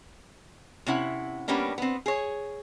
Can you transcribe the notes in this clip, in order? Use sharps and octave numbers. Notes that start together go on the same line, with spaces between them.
C3 C#4 E4 F#5
G3 A#3 B3 C#4 D4
B3 C4
G#4 C#5